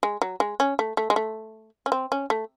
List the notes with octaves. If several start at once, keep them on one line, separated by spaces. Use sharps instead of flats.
G#3
F#3
G#3
C#4
A3
A3
G#3
A3
C#4
C4
C#4
A3